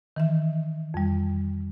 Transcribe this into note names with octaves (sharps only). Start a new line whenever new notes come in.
D#3 E3 E5
F2 G3